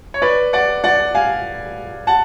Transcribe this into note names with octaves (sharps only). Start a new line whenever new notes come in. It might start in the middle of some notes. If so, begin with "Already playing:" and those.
C#5
B4 D5
D5 F#5
D5 F#5
F5 G#5
F#5 A5